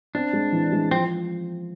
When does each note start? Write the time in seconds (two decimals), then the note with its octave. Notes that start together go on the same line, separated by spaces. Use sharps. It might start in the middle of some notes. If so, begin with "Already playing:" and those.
0.15 C4 D4
0.33 G#3
0.52 E3
0.72 G#3
0.91 F3 C4